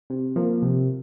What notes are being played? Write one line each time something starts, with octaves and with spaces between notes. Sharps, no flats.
C3
F3 A#3
C3